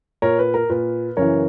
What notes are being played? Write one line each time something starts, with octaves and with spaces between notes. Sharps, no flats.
A#2 A#4 C#5
B4
A#4
A#2 B4
F#2 C#3 E3 A#4 C#5